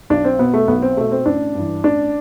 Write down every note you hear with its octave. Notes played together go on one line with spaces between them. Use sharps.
B1 D4
C4
B2 B3
A3
B1 B3
C4
B2 A3
C4
A1 D4
G2 E3
A1 D4